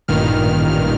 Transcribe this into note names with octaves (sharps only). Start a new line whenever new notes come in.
A1 G2 A#2 D#3 F6